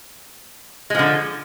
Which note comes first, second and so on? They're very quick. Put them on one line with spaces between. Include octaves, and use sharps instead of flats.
G#3 F3 D3